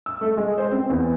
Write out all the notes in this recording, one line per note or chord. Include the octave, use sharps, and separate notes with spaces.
E6
A3
G#3
C5
C4
E2